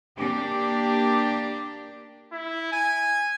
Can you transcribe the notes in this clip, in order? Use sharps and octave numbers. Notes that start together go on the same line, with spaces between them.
A#3 D4 G4
E4
G#5